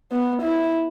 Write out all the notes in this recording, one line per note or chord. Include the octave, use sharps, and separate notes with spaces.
B3
E4